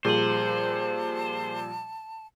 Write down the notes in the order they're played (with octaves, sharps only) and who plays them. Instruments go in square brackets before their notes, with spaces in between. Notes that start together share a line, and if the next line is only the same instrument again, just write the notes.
[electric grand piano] A#2 F3 G3 [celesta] G#4 D#7 F#7 [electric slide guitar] C5 [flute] A5